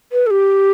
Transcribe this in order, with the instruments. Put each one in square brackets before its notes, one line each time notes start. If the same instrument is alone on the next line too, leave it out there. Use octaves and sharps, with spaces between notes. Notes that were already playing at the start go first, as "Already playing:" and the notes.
[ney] B4
A4
G4